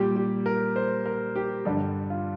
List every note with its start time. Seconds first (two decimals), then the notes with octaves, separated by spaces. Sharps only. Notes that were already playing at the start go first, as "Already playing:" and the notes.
Already playing: A#2 G3 G4
0.16 G4
0.46 A#4
0.76 C5
1.06 A#4
1.36 G4
1.65 G2 D3 G3
2.10 F4